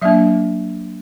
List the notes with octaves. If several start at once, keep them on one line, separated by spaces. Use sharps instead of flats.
F#3 A#3 D4 E5